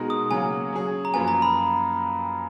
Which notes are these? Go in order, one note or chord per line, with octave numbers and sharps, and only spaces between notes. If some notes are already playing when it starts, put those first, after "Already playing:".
Already playing: B2 G#3 D#4 F#4 A#4
D#6
C#3 F#3 A#3 C#4 F#4 G#5
F#3 C#4 G#4
A#5
F#2 F3 A#3 F4 B4 G#5
A#5
B5